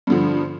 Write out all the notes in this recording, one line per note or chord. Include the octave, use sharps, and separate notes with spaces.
G2 D3 F3